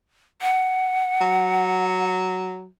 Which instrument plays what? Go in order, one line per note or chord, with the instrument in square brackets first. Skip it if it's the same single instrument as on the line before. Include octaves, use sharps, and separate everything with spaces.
[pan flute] F#5
[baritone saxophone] F#3